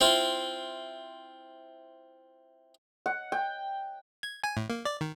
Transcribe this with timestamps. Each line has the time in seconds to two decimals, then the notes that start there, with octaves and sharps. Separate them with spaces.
0.01 C4 E4 F4
3.06 F#5
3.32 G5
4.23 G#6
4.44 G#5
4.57 A2
4.70 A#3
4.85 D5
5.01 D#3